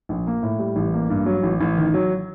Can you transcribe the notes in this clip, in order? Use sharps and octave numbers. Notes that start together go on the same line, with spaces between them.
A#1
A#3
A2
G3
A1
A#3
G2
F#3
A1
A1
D#3
F#3